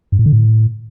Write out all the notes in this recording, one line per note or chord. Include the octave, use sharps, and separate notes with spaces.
G2
A2
D3
A2